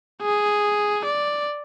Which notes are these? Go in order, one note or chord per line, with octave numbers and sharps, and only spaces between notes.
G#4
D5